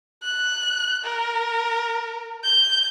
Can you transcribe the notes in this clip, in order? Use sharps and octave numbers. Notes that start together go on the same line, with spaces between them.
F#6
A#4
G6